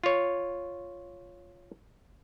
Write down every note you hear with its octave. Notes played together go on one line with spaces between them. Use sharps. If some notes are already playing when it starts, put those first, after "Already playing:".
F4 C#5